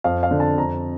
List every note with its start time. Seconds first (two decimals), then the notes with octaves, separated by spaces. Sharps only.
0.04 F2 F5
0.23 F5
0.31 D3
0.40 A5
0.58 F2 A#5